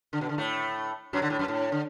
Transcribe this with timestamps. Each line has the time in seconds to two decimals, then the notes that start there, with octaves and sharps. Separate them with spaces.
0.13 D3
0.21 B2
0.29 D3
0.38 A2 A3
1.13 F#2 F#3
1.22 D3
1.30 A2
1.39 F#2
1.48 A2
1.72 D3